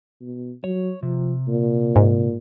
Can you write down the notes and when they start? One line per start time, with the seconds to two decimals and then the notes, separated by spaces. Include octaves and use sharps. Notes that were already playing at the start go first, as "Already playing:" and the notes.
0.21 B2
0.64 F#3 C#5
1.03 C3 F3
1.48 A#2
1.96 G#2